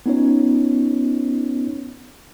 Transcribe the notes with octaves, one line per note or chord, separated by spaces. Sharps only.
B3 C#4 D#4 F4 C#5